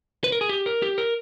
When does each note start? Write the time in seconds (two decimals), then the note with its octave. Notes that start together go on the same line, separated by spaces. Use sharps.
0.24 B4
0.32 A#4
0.41 G#4
0.49 G4
0.66 A#4
0.82 G4
0.98 A#4